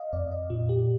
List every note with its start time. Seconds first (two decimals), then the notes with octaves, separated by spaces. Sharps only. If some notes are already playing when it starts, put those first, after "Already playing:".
Already playing: D#5 F5
0.13 F2 D5
0.31 D#5
0.50 A#2 F4
0.69 G4